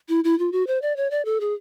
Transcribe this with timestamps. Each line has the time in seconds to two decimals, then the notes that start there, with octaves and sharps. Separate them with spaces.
0.09 E4
0.24 E4
0.39 F4
0.52 F#4
0.67 C5
0.82 D5
0.97 C#5
1.11 D5
1.25 A4
1.40 G#4